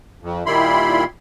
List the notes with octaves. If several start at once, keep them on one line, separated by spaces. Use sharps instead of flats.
F2
A#2 D#3 G3 E4 B5 C6